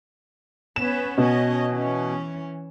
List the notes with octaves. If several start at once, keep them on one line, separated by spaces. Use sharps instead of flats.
B3 C#4 B4 E7
B2 C#4 D#5
E3 C#4